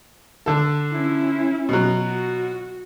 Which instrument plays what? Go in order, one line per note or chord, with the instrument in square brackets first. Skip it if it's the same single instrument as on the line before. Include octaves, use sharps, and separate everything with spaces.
[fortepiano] D3 A4
[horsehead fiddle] C#4 E4
[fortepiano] B2 F#3
[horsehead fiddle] F#4